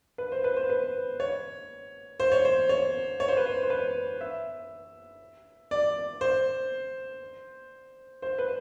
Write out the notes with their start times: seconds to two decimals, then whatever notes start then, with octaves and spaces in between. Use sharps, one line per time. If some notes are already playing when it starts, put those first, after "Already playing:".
0.18 B4
0.32 C5
0.44 B4
0.57 C5
0.70 B4
1.20 C#5
2.20 C5
2.32 C#5
2.45 C5
2.69 C#5
3.20 C#5
3.28 C5
3.37 B4
3.46 C5
3.63 C5
3.70 B4
4.21 E5
5.71 D5
6.21 C5
8.22 C5
8.39 B4